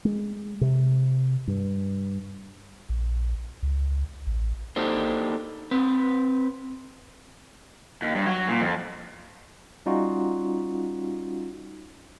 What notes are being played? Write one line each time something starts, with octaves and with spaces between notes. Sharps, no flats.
G#3
C3
G2
A#1
C#2
A1
A#3 D4 D#4 G4 A4 C5
C4 B4
D#2
G2
F#3
A#2
F2
G3 C#4 D#4 F4 F#4